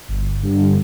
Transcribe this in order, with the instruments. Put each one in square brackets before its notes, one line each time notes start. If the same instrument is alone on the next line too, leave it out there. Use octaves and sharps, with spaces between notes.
[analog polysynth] G1
G2 D3 G3